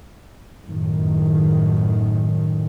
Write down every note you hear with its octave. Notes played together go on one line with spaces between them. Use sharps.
F#2 A2 D#3